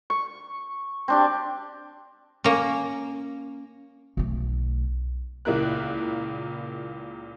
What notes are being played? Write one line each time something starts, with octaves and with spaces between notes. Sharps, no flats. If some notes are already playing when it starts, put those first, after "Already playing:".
C#6
C4 D4 G4
A#3 C#4
B1 A3
C#2 A#2 E4 A#4 F#6